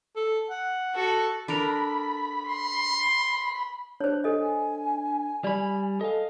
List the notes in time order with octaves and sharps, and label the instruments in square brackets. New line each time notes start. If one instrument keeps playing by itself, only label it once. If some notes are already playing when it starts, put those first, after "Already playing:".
[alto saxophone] A4
F#5
[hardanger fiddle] F#4 A4
[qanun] D4 A4 A#4 [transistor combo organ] B5
[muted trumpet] C6
[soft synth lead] D4 [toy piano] C5 C#5
[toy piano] A4 D#5 [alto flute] G#5
[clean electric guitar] G3 B5 [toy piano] D5
[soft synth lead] A4 [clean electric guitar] D#5 F5